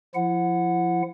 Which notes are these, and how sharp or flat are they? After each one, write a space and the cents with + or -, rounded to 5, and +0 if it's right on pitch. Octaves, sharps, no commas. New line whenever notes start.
F3 +0 E4 +30 F#5 -15